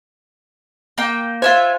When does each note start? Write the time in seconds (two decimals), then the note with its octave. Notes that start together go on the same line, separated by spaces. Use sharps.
0.98 A#3 G5
1.42 F4 C5 E5 G#5